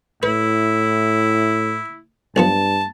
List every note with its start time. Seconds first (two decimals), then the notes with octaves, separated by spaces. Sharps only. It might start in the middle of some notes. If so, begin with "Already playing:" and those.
0.23 A2 E4 B4
2.36 B1 G2 F3 B3 A5